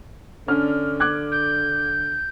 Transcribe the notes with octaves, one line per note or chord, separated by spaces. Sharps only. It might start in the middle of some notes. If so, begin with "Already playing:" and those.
D3 C#4 D4 F6
D6 F#6 G#6
G6